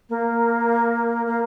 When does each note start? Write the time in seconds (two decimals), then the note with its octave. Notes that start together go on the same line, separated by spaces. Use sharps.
0.10 A#3
1.26 A#3